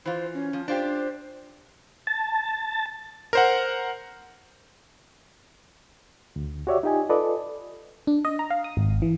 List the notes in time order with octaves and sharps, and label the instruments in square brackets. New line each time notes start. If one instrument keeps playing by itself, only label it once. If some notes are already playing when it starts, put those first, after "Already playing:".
[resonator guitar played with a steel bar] E3 F4 [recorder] C5
[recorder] C#4
[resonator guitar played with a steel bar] F3
[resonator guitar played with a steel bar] D4 F4 G4 [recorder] C5
[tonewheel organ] A5
[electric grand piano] A#4 C5 F#5
[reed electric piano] D2
F#4 G4 C#5 D5 E5
D#4 F4 G4 D#5 G#5
F4 A4 B4 D5 D#5
[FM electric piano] D4
D#5
A#5
F5
D#6
G#1
E3